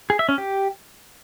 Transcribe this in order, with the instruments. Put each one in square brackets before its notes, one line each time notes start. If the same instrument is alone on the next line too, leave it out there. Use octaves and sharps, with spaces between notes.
[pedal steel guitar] G#4
E5
C#4
G4